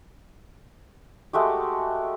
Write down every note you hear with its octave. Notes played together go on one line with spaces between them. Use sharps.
G#3 A3 F#4 G4